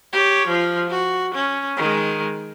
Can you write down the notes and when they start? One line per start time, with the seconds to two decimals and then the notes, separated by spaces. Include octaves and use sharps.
0.12 G4 C#5
0.47 F3 F4
0.89 F#4
1.35 C#4
1.77 D#3 G#3